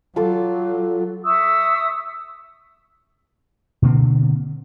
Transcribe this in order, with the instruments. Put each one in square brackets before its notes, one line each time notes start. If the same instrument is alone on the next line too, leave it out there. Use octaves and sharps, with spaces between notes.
[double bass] F#3 [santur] F4 A4 D6
[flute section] E5 C#6 D#6 E6
[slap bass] B2 D3 A#3 C4